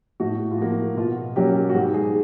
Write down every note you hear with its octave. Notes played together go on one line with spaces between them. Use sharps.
A2 F#4
F4
F3 A#3 F#4
B2 F4
F#3 A#3 C#4 G4
F#4
G#2 G4
G#4